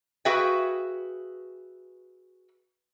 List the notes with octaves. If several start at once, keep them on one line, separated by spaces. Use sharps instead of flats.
F#4 G#4 B4 E5 F5 G5